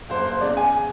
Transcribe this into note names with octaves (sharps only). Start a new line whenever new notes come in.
F#1 C5
C5
E2 C#3 D5
G#5